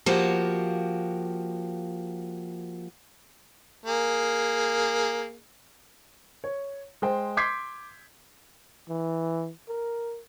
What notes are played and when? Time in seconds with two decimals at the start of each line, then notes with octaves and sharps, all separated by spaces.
0.06 F3 A#3 F#4 G4
3.86 A#3 G#4
6.44 C#5
7.02 G#3 C5 G5
7.37 C6 D6 G6 G#6 B6 C7
8.89 E3
9.68 A#4